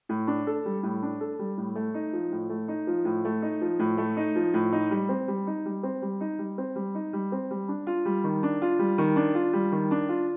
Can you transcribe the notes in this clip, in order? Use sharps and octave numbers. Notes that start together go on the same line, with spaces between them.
A2
D4
A4
G3
A2
D4
A4
G3
A2
A3
D#4
F3
A2
A3
D#4
F3
A2
A3
D#4
F3
A2
A3
D#4
F3
A2
D#4
G3
C4
G3
D#4
G3
C4
G3
D#4
G3
C4
G3
D#4
G3
C4
G3
D4
F4
G3
D#3
D4
F4
G3
D#3
D4
F4
G3
D#3
D4
F4